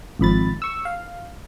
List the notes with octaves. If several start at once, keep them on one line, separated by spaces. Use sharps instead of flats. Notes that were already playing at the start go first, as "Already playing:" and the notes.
G#1 F2 B5 A6
C#6 E6
F5